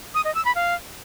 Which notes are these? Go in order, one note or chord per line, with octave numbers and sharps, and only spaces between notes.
D#6
D#5
E6
B5
F5